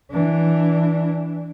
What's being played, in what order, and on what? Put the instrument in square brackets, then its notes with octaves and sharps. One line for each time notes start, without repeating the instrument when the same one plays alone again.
[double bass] E3 D4